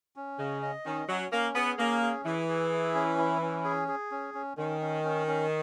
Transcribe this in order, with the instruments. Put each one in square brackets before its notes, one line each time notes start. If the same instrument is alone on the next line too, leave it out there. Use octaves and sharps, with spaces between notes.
[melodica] C#4
[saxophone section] C#3 [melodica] D#5
[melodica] D#5
[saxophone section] D#3 [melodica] C#4
[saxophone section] F#3 [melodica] C#4
[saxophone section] A#3 [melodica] C#4
[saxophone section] B3 [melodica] G#4
[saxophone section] A#3 [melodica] C#4
[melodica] G#4
[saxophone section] E3 [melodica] G#4
[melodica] G#4
E4
C#4
E4
C#4
G#4
G#4
C#4
C#4
[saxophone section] D#3 [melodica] C#4
[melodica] C#4
C#4
C#4